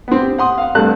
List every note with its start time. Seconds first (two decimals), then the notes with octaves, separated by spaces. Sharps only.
0.08 B3 C4
0.21 G4
0.38 F#5 C6 D#6
0.58 F5 F#5
0.75 G2 C3 A3 A5 F#6